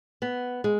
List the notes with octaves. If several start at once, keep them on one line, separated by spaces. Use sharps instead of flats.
B3
G#3